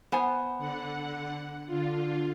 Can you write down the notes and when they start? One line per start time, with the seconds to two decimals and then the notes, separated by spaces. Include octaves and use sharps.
0.12 B3 C5 G#5
0.58 D3 F#5
1.67 D3 F4